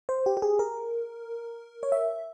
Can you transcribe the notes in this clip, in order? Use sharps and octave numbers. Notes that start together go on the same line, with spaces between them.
C5
G4
G4
G#4
A#4
C#5
E5